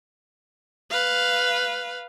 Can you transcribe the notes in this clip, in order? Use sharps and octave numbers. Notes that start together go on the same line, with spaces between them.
B4 F5